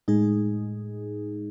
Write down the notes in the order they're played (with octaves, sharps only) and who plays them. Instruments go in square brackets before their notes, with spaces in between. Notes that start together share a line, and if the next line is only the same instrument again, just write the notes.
[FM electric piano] A2 G#3 D#4 G#4